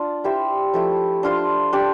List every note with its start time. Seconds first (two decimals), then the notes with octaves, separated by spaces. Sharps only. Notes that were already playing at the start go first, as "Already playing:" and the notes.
Already playing: D4 F4
0.24 E4 G4 C5 E5
0.74 F3 A3 E4
1.23 D4 F4 C5
1.73 D4 G4 D5